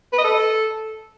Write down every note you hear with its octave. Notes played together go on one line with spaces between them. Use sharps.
B4
D#5
A4